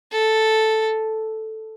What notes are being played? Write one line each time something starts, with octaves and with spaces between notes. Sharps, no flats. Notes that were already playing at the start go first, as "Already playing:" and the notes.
A4